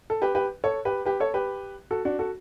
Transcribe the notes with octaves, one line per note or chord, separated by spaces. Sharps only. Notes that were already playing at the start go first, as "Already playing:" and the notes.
A4
G4 B4
G4 B4
A4 C#5
G4 B4
G4 B4
A4 C#5
G4 B4
F#4 A4
D4 F#4
F#4 A4